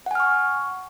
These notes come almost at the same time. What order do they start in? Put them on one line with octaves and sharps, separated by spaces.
F#5 G#5 F6 C#6